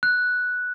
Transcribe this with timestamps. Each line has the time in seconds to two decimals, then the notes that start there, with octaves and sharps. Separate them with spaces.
0.03 F#6